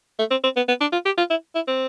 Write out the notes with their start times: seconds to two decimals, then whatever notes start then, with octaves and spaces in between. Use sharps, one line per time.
0.19 A3
0.31 C4
0.44 C4
0.56 B3
0.68 B3
0.81 D4
0.92 F4
1.06 G4
1.18 F4
1.31 E4
1.55 E4
1.68 C4